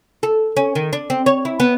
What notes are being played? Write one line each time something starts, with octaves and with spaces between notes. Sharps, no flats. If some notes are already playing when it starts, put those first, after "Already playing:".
A4
C#4
D#3
D4
C4
C#5
E4
B3